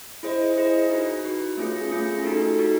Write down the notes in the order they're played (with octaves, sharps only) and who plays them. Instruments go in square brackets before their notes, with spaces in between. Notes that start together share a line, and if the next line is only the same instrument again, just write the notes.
[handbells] E4 G#4 C5 D#5
E4 G#4 C5 D#5
D#4 F#4 B4
D#4 F#4 B4
A3 C#4 F4 G#4
A3 C#4 F4 G#4
D#4 F#4 A4
D#4 F#4 A4